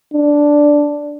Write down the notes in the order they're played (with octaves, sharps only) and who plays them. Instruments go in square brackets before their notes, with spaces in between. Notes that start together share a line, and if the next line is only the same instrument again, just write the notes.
[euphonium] D4